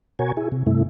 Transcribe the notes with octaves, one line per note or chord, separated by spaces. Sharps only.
B2 F#4 A#4 C#5 G#5
E4 G#4
C3
G2 C3 A3 E4